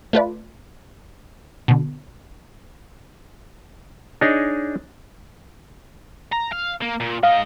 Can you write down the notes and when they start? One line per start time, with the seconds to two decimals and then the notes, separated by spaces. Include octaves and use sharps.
0.13 A3 F4 B4 D5
1.68 B2 D3
4.21 D4 D#4 G#4 C#5 D#5
6.33 A#5
6.53 F5
6.82 A#3
7.00 A#2
7.23 G#2 D#5 F5